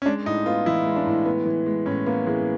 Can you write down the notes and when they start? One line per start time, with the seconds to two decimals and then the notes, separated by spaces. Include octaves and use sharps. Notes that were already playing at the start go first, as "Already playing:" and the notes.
0.02 C#4
0.06 G#3 D4
0.26 A2 D#4
0.46 B3 F4
0.66 E3 E4
0.86 G#3
0.96 D4
1.06 A2
1.26 B3
1.46 E3
1.66 G#3
1.86 A2 C#4
2.06 A#3 B3
2.27 E3 G#3